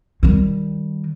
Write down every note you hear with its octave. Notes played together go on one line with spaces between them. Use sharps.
D#3 G3